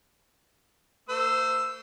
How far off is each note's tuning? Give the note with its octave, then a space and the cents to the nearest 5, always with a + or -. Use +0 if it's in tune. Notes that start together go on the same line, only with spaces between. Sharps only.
A#3 -45 C5 -20 E6 +10